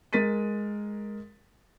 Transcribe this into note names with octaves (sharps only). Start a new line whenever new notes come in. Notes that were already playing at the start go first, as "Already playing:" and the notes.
G#3 A#4 A6 B6 D#7